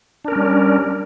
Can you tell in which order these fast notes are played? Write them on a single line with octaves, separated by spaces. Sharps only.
D4 A#4 C#4 G3